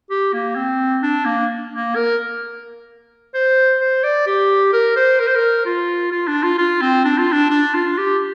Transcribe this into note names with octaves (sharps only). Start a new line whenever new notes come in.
G4
A#3
C4
D4
A#3
A#3
A#4
C5
C5
D5
G4
A#4
C5
A#4
C5
A#4
F4
F4
D4
F4
F4
C4
D4
F4
D4
D4
F4
G4